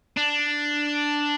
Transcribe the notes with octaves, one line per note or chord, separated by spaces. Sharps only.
D4